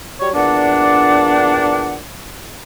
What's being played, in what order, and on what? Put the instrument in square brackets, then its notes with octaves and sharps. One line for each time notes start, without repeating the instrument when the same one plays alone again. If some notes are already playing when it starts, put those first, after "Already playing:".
[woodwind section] F#3 G3 C#5
[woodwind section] E2 A#2 D4 [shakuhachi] F#5